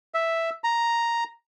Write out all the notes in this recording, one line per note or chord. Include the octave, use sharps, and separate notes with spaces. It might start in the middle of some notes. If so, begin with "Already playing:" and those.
E5
A#5